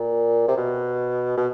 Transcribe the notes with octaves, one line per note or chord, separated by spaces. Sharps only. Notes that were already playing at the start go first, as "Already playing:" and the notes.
Already playing: A#2
C3
B2
B2